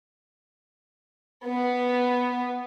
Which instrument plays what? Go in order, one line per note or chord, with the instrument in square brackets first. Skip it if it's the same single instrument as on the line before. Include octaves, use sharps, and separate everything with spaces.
[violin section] B3